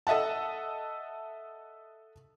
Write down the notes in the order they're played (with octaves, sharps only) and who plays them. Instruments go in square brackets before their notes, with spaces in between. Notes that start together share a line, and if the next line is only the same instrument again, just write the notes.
[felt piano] A4 D#5 E5 F#5 A5